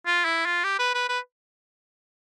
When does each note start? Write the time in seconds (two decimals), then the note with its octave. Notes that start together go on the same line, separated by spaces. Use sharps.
0.06 F4
0.25 E4
0.46 F4
0.64 G4
0.79 B4
0.94 B4
1.09 B4